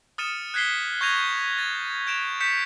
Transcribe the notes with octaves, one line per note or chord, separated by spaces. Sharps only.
D#6 F6 A6 C#7 D#7 E7
F#6 G#6 B6 C7 G7
C#6 G6 G#6 A#6 D#7 F7
A6
G6 D7 E7 F7
G6 B6 C#7 E7